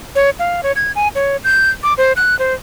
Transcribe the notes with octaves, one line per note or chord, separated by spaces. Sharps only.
C#5
F5
C#5
G#6
G#5
C#5
G6
D6
C5
F#6
C5